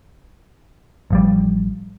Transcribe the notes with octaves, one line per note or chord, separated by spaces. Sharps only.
A1 F3 G3